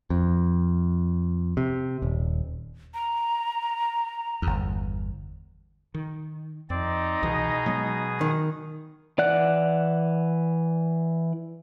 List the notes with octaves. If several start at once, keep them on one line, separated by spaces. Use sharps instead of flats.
F2
C3
D#1
A#5
G1 E2
D#3
F2 C4 D#4 D5
C2 B2 E3 G#4 D#6
F#3 G#3 B3
D#3
E3 D5 F#5 F#6